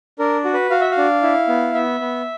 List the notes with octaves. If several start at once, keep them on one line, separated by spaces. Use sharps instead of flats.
D4 A#4
F#4
B4
F#4 F5
E5
F5
D4
E4
B3
B3 E5
B3